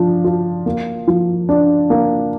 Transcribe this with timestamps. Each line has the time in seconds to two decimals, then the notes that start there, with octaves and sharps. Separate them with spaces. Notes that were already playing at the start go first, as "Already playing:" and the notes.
Already playing: F3 D4
0.24 F4
0.66 A#3
1.07 F3
1.49 D4
1.90 A#3